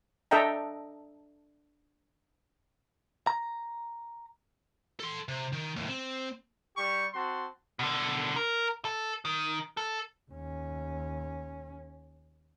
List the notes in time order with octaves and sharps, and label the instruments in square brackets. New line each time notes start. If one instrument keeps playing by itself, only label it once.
[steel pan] D4 A4 D#5 E5 G5 A#5
[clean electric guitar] A#5
[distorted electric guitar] A4 C6
C3
D#3
D#2 A2
C4
[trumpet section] G3 G4 C#6
C4 F#4 A5 C6
[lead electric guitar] B2 D3
A#4
A4
D#3
A4
[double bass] D#2 C#4